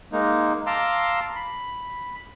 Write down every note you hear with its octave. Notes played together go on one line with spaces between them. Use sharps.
G#3 A#3 D#4
F5 A5 A#5 C6 D6 E6
B5